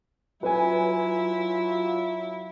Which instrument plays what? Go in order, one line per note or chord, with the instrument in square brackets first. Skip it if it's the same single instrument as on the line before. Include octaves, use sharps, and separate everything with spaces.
[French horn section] F#3 F4 [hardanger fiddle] E4 [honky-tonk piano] B4 G#5